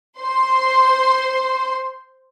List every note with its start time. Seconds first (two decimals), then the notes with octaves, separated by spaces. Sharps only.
0.19 C5 C6